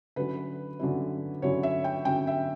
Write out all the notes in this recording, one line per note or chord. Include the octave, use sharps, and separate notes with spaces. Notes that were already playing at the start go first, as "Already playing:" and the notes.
D3 F#3 C#4 E4 B4
D3 F#3 C#4 E4
D3 F#3 C#4 E4 C#5
E5
G5
D3 F#3 C#4 E4 G5
E5